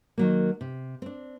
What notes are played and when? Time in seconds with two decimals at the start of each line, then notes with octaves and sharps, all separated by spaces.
0.18 D#3 F#3 A#3
0.61 C3
1.02 C4 D4